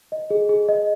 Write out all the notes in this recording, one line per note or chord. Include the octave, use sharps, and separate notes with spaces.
D#5
G#4
G#4
D#5